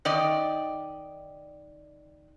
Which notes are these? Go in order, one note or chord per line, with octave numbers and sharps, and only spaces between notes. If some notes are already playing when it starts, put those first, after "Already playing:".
D#3 D5 D#5